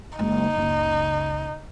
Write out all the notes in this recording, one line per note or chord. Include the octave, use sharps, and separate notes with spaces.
F#1 G#3 D#4
F#1 C#2